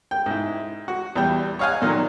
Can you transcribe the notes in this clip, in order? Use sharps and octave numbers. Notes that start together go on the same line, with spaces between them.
G5
G#2 E4
F#4
E2 G3 G5
C#5 D#5 F5 F#5 G#5
A#2 D#3 F#3